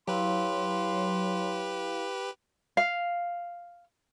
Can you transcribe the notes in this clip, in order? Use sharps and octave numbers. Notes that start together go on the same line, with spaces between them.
F#3 E4 G4 B4 F5 C6
F5